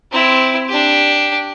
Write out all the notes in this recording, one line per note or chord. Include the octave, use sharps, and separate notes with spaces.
C4 E4
D4 G4